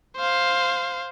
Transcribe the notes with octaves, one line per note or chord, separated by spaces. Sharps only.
C5 F5